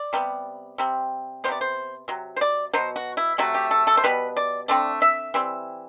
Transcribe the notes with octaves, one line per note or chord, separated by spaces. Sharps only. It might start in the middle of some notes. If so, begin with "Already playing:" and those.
Already playing: D5
C3 G3 B3
C3 G3 C4
C3 G3 B3 C5 D5
C5
C3 F#3
C5
D5
B2 F#3 B3 C5
F#4
E4
C3 F#3 A3 F#4
G4
A4
A4
C5
B2 G3 B3 B4
D5
D3 A3 C4 D5
E5
E3 G3 C4